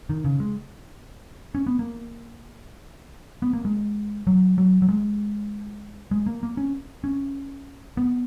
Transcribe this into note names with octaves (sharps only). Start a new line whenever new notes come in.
D#3
C#3
G#3
C#4
B3
A#3
B3
A#3
G#3
F#3
F#3
F#3
G#3
G#3
A#3
A#3
C#4
C#4
B3